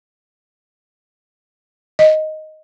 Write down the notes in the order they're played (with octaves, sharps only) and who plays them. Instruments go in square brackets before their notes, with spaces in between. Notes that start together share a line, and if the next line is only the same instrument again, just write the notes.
[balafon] D#5